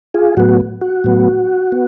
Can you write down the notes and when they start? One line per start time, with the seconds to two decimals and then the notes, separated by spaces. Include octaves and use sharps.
0.14 F4 G#4
0.37 A2 F#3 B3 F#4
0.81 F#4
1.04 A2 F#3 B3
1.72 B3